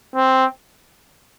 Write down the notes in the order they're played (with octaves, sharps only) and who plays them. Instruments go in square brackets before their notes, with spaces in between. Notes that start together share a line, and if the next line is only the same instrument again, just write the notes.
[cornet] C4